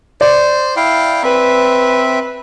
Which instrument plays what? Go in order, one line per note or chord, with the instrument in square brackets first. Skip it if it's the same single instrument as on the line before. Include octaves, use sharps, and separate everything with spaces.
[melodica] C5 [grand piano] D5
[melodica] E4 F5 G5
[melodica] C4 E5 [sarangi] B4